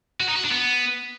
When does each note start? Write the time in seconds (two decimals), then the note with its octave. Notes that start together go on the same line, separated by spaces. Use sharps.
0.20 F#4
0.28 D#4
0.36 F#4
0.44 D4
0.51 B3